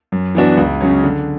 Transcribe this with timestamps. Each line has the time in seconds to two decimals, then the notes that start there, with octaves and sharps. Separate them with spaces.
0.12 F#2
0.35 E3 B3 D4 F#4
0.57 C#2
0.81 C#3 F#3 C#4
1.04 D3